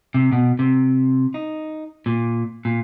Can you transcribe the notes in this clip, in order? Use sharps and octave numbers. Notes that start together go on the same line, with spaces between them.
C3
B2
C3
D#4
A#2
A#2